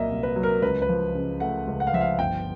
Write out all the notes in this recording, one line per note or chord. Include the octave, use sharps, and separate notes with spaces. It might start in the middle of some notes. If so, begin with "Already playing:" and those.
Already playing: C2 A#2 F#3 A#3 D#5 E5
C2
B4
F#3
A#4
C#2 B4
B4
F3
C#3
A3 F#5
C#2
F#5
F5
F3 E5
F5
G1 G5